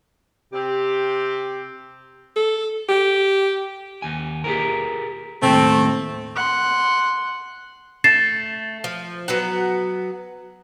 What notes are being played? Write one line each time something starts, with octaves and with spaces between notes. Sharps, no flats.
C3 C4 G4
A4
G4
D#2 G#5
G4 G#4 A#4
D#2 A2 C3 A3 C4
F#5 C6
A3 A6 C7 E7
F3
F#3 B3 F#5